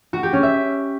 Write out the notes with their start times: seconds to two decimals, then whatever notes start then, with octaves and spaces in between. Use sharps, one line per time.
0.13 F#4
0.23 G4
0.33 C#4
0.43 E5